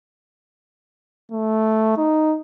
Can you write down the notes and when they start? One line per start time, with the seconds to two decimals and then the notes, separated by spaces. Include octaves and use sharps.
1.32 A3
1.98 D#4